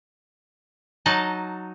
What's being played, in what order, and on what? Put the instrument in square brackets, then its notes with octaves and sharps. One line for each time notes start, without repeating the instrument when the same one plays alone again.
[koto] F#3 D#4 D#5 A5